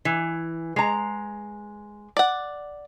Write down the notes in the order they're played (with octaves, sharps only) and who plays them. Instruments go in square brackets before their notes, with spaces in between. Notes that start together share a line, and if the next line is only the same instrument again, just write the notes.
[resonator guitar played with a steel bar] E3
G#3 A#5
[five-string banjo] D5 F#5